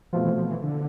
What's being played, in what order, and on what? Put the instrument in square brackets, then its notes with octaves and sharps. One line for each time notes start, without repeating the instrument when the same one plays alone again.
[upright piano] B2 A3 C4 F4 [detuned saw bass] F3
[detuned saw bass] E3
F3
E3
D3